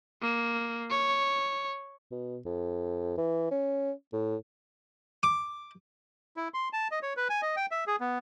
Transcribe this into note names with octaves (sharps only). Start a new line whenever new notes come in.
A#3
C#5
B2
F2
E3
C#4
A2
D6
E4
C6
A5
D#5
C#5
B4
G#5
D#5
G5
E5
G#4
B3